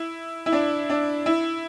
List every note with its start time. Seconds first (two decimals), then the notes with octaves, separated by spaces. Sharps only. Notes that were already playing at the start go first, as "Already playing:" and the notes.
Already playing: E4
0.46 E4
0.52 D4
0.90 D4
1.26 E4